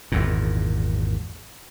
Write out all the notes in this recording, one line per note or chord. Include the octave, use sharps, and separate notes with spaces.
G#1 E2 A#2